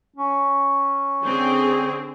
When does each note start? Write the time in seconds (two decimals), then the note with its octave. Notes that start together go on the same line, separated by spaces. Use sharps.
0.16 C#4
1.25 D3 C4 G#4